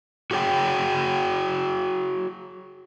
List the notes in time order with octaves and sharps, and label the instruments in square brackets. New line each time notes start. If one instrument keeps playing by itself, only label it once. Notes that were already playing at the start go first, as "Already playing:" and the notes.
[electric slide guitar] F#4 G#4 C#5 G5